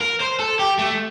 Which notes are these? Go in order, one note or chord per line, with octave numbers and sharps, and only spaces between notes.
A#4
C5
A4
G4
A3